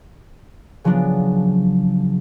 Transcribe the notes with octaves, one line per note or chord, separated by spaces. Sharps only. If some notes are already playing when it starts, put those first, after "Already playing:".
C#3 F3 F#3 B3 D4